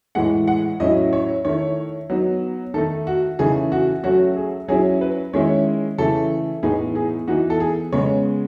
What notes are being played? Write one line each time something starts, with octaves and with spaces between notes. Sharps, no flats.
A2 E3 G#3 F#5
F#5
A2 F#3 C#4 E4 D#5
C#5
D#3 A3 E4 C#5
F#3 B3 D#4
D#3 A3 D#4 A4
F#4
C#3 E3 A3 D#4 G#4
F#4
F#3 A3 C#4 F#4
G#4
F#3 C#4 E4 G#4
B4
D#3 G#3 C#4 E4 C#5
C#3 E3 A3 A4
A2 E3 B3 D#4 G#4
G#4
E3 B3 D#4 F#4
A4
G#4
C#3 G#3 B3 C#5